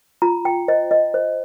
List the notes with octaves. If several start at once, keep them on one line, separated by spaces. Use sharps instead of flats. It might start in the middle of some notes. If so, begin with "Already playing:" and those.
F4 A#5
G5
C5 D#5
D#5
C5